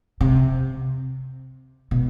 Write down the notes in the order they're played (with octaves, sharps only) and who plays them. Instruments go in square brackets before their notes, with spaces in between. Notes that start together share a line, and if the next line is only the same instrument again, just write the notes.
[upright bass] C3
B2